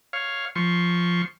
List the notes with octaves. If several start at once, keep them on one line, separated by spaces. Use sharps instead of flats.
C#5 F5
F3 C6 C#6